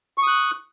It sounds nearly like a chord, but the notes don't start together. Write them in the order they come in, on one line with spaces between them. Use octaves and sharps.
C#6 D#6 F#6